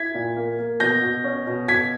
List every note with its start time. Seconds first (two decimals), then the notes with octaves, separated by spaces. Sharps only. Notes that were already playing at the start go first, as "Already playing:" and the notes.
Already playing: E4 G#6 B6
0.14 A#2
0.36 A#3
0.59 A#3
0.80 B2 G6 A#6
1.02 B2
1.24 C#4
1.47 B2
1.68 B2 G#6 B6